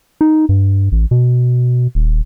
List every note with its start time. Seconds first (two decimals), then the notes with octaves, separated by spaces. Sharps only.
0.21 D#4
0.49 G2
0.92 A1
1.11 B2
1.95 D#1